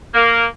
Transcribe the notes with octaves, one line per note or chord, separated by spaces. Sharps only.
A#3